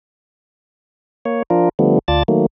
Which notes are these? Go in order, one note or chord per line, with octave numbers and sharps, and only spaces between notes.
A#3 C#5
F3 D4 F4 A#4
D3 F3 G3 A3 B3
D2 F4 D5 A5 A6
D#3 F#3 A3 A#3